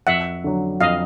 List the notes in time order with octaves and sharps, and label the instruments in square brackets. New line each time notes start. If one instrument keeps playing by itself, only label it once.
[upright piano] F2 [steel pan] E5 F#5
[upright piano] D3 F#3
[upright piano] F2 [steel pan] D#5 F5